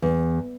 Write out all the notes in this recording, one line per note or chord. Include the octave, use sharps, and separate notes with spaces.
E2